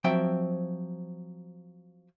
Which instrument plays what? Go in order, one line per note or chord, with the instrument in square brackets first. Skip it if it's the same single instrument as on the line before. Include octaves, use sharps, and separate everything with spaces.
[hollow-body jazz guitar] F3 F#3 C4 E5 G5